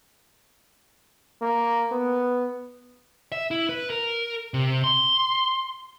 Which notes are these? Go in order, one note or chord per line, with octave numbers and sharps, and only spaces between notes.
A#3
B3
E5
E4
B4
A#4
C3
C6